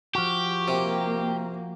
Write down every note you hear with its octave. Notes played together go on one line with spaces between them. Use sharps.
F3 F#4 G4
C3 A#3